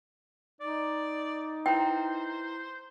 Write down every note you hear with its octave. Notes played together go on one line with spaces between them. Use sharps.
D#4 D5
E4 B4 C5 G5 A#5